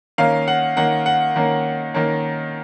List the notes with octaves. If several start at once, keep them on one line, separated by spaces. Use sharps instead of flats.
D#3 A#3 C#4 F5
F#5
D#3 A#3 C#4 F#5
F#5
D#3 A#3 C#4
D#3 A#3 C#4